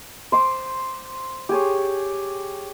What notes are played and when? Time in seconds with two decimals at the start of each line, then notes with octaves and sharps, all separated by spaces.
0.32 C5 C6 D6
1.49 G4 G#4 C#5